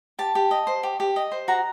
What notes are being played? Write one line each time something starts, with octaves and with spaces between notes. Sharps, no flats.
G4 A5
G4
D#5
C5
G4
G4
D#5
C5
F#4 A#5